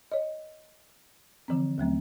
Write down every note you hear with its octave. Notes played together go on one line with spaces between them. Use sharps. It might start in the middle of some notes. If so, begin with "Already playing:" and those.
C#5 D#5
D3 E3 F3 C4
D#2 F#3 A3 C4